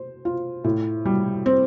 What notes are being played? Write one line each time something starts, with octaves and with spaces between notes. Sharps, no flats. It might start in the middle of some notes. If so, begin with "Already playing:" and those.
Already playing: C5
F4
A2
G3
C4